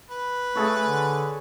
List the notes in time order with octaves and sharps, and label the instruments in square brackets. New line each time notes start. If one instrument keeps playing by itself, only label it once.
[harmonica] B4
[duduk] A3 [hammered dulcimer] G#4 A4 C#5
[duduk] D3